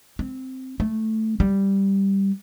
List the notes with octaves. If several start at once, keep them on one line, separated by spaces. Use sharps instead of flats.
C4
A3
G3